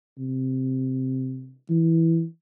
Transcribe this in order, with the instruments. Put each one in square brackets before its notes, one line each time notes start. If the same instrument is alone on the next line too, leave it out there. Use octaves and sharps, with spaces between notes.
[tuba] C3
E3